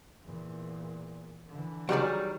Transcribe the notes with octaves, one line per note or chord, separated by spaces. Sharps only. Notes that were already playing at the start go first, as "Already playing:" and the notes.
E2 A#2
D3 E3
D#3 F#3 G3 F#4 G#4 D5